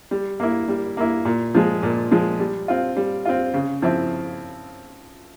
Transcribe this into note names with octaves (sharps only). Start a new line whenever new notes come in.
G3
A#3 E4
G3
A#3 E4
A#2
F3 G#3
A#2
F3 G#3
G3
C4 F4
G3
C4 F4
C#3
F3 C4 E4